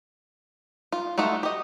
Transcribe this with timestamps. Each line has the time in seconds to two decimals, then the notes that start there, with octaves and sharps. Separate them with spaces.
0.92 F4
1.18 A3 D#4 F4 F#4
1.43 G4 D#5